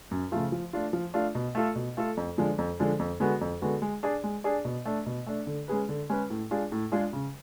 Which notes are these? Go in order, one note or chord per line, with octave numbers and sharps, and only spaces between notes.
F#2
C#3 F3 A3 F4
F3
A3 D4 F4
F3
A3 D4 F4
B2
A3 F4 A4
B2
A3 F4 A4
F2
D3 F3 G#3 D4
F2
D3 F3 G#3 D4
F2
D3 G#3 B3 F#4
F2
D3 G#3 B3 F#4
G#3
D4 G#4 D5
G#3
D4 G#4 D5
B2
A3 D4
B2
A3 D4
D3
G#3 C#4 G#4 B4
D3
G#3 C#4 G#4 B4
A2
G#3 D4 F4 G#4
A2
G#3 D4 F4 G#4
C#3